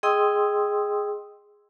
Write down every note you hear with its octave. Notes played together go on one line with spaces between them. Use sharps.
G#4 D#5 G5 C6 D#6 E6